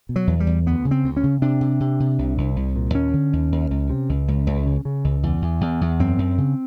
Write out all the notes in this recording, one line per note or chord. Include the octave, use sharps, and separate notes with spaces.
B2
F#3
E2
G3
E2
D2 B3
C#3
C4
D2
C#4
C#3
C3 D4
C3
C3
C3
C2
C2
C2
A#2
D#2 C#4
D3
D#2
D#2
C#2
C3
C#2
C#2
C#2
C#3
C#3
C#2
E2
E2
E2
E2
F#2 C4
F#2
C#3